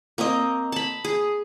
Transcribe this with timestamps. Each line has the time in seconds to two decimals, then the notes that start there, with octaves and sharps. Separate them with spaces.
0.18 A#3 C4 A#4 D#5
0.72 A5 B5
1.05 G#4